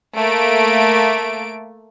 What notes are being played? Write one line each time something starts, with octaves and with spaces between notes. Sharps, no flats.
A3 A#3 D7